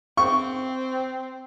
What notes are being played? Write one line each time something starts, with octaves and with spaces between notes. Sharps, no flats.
C4 C#6